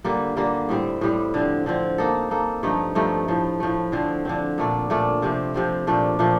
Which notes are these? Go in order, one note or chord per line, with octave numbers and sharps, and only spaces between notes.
D3 G3 A#3 F4
D3 G3 A#3 F4
A2 G3 C4
A2 G3 C4
D3 F3 C4
D3 F3 C4
A#3 D#4 A4
A#3 D#4 A4
G2 F3 A3 D#4
G2 F3 A3 D#4
A2 F3 A3
A2 F3 A3
D3 F3 C4
D3 F3 C4
A#2 A3 D4
A#2 A3 D4
C3 F3 C4
C3 F3 C4
A#2 F3 A3 D4
A#2 F3 A3 D4